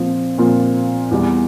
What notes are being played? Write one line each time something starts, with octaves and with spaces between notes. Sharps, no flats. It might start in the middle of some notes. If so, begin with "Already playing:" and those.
Already playing: A#2 F3 C4 F4
A#2 F3 C4 F4
E2 E3 G3